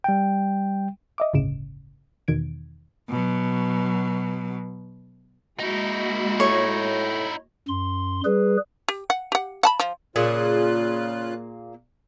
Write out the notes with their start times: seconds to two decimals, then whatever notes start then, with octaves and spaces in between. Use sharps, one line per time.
0.04 G3 G5
1.18 D#5 E5 D6
1.33 G1 D2 A2 C#3 D7 E7
2.28 E2 B2 D#3 G#6 D7
3.09 B2 F#3
5.60 G#3 A#3 D#4 E4 F#4
6.40 A2 C#5
7.69 F#2 C6
8.25 G3 G#4 B4
8.88 G4
9.10 F#5
9.32 G4 F#5
9.63 F#5 A5 B5
9.80 F3
10.16 A#2 C#3 A#3 F4 G#4 F#6